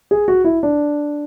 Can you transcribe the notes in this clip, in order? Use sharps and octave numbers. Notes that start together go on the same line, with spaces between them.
G#4
F#4
E4
D4